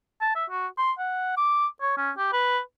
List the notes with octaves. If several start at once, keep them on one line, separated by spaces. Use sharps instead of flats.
A5
E5
F#4
C6
F#5
D6
C#5
C#4
G4
B4